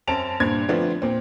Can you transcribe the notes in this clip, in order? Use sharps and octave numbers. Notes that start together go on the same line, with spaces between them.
F#2 C4 C#4 A5 D7 F7
G2 A#2 C5 G#6
D3 F3 A3 B3 C4 D4
A#2 C4